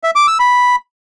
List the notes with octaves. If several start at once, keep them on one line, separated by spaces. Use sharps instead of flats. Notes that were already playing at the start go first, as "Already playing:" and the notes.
E5
D6
E6
B5